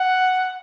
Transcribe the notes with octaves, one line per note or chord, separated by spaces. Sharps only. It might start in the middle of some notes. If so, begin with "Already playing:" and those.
Already playing: F#5